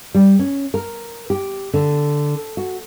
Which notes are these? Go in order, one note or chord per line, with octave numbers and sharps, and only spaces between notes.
G3
C#4
A#4
G4
D3
F#4